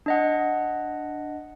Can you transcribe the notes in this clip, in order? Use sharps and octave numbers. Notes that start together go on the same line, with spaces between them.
D4 D#5 F#5